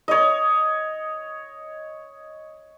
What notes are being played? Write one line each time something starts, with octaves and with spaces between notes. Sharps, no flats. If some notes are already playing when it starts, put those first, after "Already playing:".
C#5 D#5